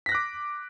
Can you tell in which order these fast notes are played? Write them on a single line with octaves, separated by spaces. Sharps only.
B6 A#6 F#6 D6